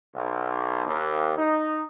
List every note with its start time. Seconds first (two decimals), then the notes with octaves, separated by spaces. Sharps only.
0.15 B1
0.87 D#2
1.38 D#4